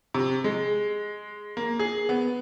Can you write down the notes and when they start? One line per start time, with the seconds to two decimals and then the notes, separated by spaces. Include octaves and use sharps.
0.14 C3
0.44 G#3
1.57 A#3
1.79 G#4
2.09 B3